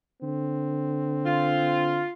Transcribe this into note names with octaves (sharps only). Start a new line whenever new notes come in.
D3 C4
F4